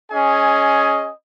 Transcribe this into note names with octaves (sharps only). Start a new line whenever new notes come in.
C#4 G#4 D#5 G#5